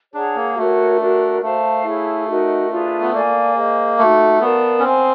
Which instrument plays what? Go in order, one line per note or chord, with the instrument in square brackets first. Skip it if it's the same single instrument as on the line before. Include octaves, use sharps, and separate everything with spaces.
[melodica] D4 [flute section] G#4 C#5 F#5 A#5
[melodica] A#3
[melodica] A3 [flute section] F#4 A#4 C#5
[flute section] D4 F#4 A#4
[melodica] A3 [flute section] C5 F5 A5
[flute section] E4 G#4 C#5 F5
D#4 F#4 A#4 D#5
D4 F4 G#4 B4
[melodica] B3
[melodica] A#3 [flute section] A4 D5 F5 G#5
[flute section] G#4 C5 D#5
[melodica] A3 [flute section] D#4 F#4 A4
[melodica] B3 [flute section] A#4 D5 F5 A5
[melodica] C#4
[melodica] C4 [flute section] C5 F5 G#5 C6